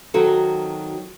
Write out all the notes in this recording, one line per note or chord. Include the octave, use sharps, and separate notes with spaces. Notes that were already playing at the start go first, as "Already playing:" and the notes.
D#3 F#3 C4 F#4 A4